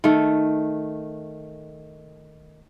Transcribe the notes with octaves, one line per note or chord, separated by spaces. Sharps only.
D#3 A3